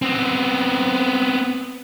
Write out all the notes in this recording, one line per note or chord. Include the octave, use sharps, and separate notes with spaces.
B3 C4